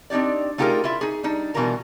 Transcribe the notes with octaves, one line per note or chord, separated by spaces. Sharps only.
C4 D4 D#4 G4 D5
A3 D#4 F4 G4 G#4 A#4
E4 F4 E5
D#4 G#4
G3 D4 D#4
B2 E3 G3 F4 A#4 A#5